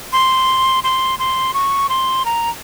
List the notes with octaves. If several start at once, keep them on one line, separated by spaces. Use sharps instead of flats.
C6
C6
C6
C#6
C6
A#5